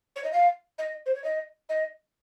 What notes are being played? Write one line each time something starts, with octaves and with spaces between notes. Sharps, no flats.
C#5
D#5
F5
D#5
C5
C#5
D#5
D#5